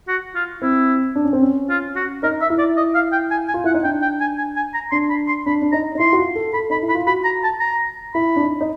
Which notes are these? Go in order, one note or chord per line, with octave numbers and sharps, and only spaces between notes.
F#4
F4
C4 E4
D4
C#4
C4
C#4
F4
F#4
D#4 A#4
E5
E4
D5
D#5
F5
G5
G#5
G#5
F4
E4 F#5
D#4
D4 G5
G5
G#5
G#5
G#5
A#5
D4 C6
B5
C6
D4 B5
D4
D#4 A#5
D#4
E4 C6
F#4
F4
A4
A4 B5
D#4 B5
E4
B5
F4
F#4 B5
A#5
A5
A#5
E4 B5
D4
D#4
D#4